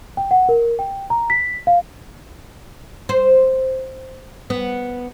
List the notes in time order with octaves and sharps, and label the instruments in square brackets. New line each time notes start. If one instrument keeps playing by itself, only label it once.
[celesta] G5
F#5
A#4
G5
A#5
B6
F5
[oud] C5
B3